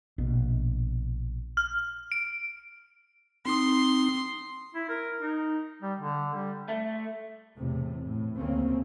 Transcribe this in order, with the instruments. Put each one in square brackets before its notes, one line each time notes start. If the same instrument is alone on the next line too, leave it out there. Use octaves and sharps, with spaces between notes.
[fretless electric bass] A#1 B2
[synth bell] F6
D7
[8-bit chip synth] C4 D#4 D#6 [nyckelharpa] C6
[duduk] E4
A#4
D#4
G3
D3
G3
[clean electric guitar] A3
[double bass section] E2 A2 C3
A2
D2 C#3 A#3 C4 C#4